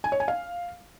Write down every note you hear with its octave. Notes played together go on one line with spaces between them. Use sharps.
G#5
C#5
G#5
F5